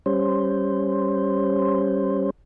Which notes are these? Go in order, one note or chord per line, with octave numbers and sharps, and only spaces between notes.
G3 C#4 C5